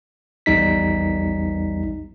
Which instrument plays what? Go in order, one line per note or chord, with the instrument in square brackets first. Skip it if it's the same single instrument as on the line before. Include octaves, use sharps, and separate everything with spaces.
[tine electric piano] A#1 E2 G3 D#4 B6